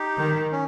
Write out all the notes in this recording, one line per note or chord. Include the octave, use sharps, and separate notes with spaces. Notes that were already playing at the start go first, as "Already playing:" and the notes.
Already playing: D#4 G4
D#3
C#4